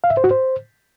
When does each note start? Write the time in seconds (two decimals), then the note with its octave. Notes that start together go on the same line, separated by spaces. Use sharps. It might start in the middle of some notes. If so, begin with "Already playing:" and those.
0.04 F5
0.10 E5
0.17 C5
0.24 F#4
0.31 C5